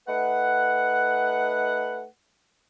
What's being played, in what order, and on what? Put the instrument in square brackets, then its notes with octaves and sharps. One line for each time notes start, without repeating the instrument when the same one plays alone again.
[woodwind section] A3 D#4 B4 F#5